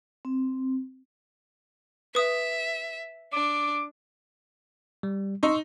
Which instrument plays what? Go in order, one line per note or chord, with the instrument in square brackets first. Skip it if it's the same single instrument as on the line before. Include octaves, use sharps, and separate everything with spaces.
[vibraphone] C4
[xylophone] B4 D#6 [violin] E5
[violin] D4 [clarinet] D6
[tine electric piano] G3
[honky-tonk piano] D#4 [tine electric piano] C6 C#6 E6